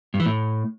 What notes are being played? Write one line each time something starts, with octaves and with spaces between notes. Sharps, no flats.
G2
E3
A2